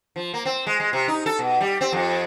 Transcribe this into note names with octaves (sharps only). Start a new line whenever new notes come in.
F3
A#3
C4
G#3
G#3
C3
D#4
A4
B2
G3
C4
F2